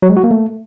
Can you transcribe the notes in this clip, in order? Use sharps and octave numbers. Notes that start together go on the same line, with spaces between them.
F#3
G#3
F#4
A#3
A3